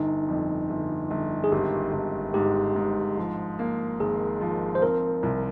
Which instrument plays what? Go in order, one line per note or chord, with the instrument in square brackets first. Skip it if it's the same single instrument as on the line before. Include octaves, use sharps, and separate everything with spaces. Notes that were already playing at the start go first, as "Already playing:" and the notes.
Already playing: [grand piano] G1 [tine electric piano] D#4
[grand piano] F2
G1
G1
[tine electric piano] G#4
[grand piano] G#1 [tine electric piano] G4
[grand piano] G#1
[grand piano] G#2 [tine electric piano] G4
[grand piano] G#2
F3
A#3
[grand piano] G#1 [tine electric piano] G#4
[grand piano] F3
[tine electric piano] C5
[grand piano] C4 [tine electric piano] A#4
[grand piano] C2